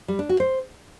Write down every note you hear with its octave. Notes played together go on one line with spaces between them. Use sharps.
G3
D4
F#4
C5